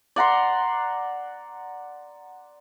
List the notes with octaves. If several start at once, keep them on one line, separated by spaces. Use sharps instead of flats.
D5 F#5 A#5 C6